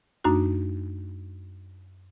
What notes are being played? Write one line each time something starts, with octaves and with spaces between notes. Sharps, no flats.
F#2 A3 D4 D#4 F#4